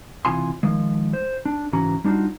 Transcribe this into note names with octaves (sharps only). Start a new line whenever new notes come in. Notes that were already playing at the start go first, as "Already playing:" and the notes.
C#2 C3 E3 F4 G#5 C6
D#3 F3 G#3
C5
D4
C#2 G#2 E3 C#4 F#4 A#5
G3 D4 D#4 F4 F#4